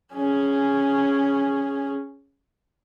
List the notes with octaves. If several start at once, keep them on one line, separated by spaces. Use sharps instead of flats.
C#4 G#4